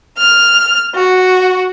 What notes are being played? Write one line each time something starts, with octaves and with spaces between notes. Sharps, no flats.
F6
F#4